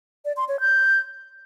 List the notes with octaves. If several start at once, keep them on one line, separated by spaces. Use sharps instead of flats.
D5
C6
C#5
G6